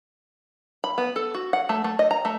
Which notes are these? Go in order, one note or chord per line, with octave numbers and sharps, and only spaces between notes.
B5
B3
A4
F#4
F#5
A3
A3
D#5
A#5
A3